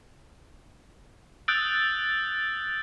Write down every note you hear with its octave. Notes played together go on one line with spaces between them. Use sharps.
D#6 E6 F#6 G6 A6 D7